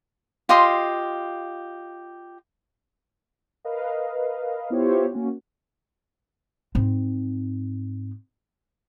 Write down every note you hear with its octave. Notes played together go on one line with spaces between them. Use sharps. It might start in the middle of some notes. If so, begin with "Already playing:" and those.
F4 G4 D#5 C6
A#4 B4 D#5 F5
B3 E4 F4 G4 C5 C#5
A#3 C#4 F#4
G#2 C4